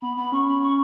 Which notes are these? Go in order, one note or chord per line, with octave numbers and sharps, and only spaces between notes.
B3 B5
B3 B5
C#4 C#6
B5
C#6